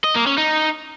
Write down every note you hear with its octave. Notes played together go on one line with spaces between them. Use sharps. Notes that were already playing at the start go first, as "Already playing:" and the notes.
D#5
A#3
C#4
D#4